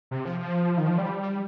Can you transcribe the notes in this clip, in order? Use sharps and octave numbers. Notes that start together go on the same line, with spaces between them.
C3
F3
F3
D#3
F3
G3